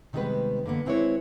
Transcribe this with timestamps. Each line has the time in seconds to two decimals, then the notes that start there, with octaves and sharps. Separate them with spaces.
0.13 C3 D#3 G3 G#3 B3 B4
0.66 D3 D#3 A#3 B3
0.85 D#3 G#3 C4 E4 B4 C#5